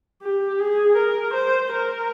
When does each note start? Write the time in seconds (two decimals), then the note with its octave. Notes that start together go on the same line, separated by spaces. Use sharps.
0.23 G4
0.60 G#4
0.97 A#4
1.34 C5
1.72 A#4